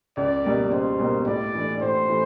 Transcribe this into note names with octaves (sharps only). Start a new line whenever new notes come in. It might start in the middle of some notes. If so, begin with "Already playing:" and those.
C#2 D5
B2 G3 A#3
C#2 C5
B2 G3 A#3
A2 D5
E3 A3 D4
A2 C5
E3 A3